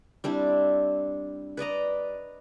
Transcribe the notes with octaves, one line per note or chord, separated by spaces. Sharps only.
G3 C4 D4 E4
B4 D5 D#5 A#5